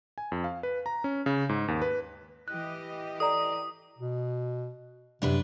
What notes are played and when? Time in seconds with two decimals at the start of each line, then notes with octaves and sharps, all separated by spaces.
0.18 G#5
0.32 F2
0.44 F5
0.63 B4
0.86 A#5
1.04 C#4
1.26 C#3
1.49 G#2
1.68 D#2
1.82 B4
2.48 E3 G4 D#5 F#6
3.20 A4 D5 A#5 D#6
3.98 B2
5.22 F#2 C3 D4 B4